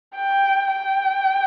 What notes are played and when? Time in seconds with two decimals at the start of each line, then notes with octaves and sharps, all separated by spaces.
0.15 G5
0.74 G5